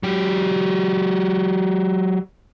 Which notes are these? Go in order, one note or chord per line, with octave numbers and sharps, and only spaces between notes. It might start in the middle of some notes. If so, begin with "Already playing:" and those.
F#3 G4